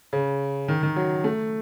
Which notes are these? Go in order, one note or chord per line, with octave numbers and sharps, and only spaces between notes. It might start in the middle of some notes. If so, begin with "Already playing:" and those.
C#3
D#3
D#3
F#3
A3